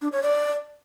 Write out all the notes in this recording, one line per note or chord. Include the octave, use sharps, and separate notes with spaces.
D4
C#5
D5